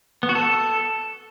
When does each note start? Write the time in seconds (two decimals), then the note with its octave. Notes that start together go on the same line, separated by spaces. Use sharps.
0.23 B3
0.29 F#4
0.35 A4